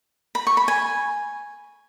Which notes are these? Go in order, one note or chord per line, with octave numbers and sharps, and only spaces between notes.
B5
C#6
B5
G#5